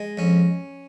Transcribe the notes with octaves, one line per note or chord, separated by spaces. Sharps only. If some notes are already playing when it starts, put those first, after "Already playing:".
Already playing: G#3
F2 C#4